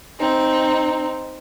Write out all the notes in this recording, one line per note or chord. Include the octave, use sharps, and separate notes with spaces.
C4 D#4